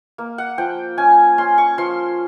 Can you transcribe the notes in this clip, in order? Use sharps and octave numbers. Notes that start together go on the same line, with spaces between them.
A#3
F#5
F3 G5
C#4 G#5
C#4 C6
C#6
F3 C6